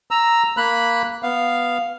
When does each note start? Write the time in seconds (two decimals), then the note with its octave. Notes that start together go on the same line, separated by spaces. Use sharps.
0.11 A#5 E6
0.57 A#3 B5 F#6
1.23 B3 F5